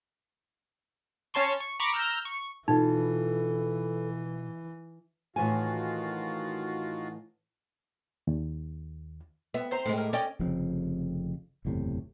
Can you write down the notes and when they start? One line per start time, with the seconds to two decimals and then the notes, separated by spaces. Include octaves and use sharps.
1.34 C#4 C#5 A5 C6 C#6
1.60 C#6
1.80 A#5 B5 C#6 D6
1.93 A#5 E6 F6 G6
2.25 C#6
2.68 B2 E3 D#4 F4 A4
5.36 A2 D#3 E3 F4 F#4 G#5
8.27 D#2
9.54 B3 E5
9.71 C4 C5 A#5
9.86 A2 G#3
9.97 A#4
10.13 C#4 D5 D#5 G5
10.40 F1 F2 C#3 C4
11.65 F#1 E2 A2 C3